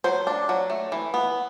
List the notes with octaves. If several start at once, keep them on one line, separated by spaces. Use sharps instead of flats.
F#3 C5
D4
F#3
A3
E3
B3